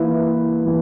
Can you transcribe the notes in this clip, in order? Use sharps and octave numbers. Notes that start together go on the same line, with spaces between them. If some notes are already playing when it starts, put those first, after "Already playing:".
Already playing: E3 A#3 E4 B4
E3